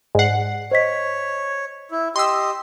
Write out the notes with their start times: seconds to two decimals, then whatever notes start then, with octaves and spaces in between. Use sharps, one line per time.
0.15 G#2 D5 F#5 C7
0.71 C5 C#5 D#5 B6
1.91 E4
2.16 G4 D#5 C6 E6